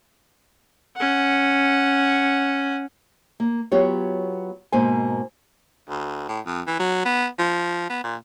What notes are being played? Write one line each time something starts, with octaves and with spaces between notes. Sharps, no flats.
C#4 F#5
A#3
F#3 B3 F4 G4 C#5
G#2 B2 A#3 C4 C5 G#5
D2
A2
F2
E3
F#3
B3
F3
B3
A#2